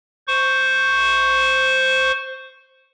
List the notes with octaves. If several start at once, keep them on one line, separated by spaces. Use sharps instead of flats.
C5 C#6